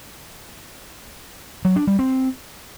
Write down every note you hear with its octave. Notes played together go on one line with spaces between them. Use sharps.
F#3
D4
G3
C4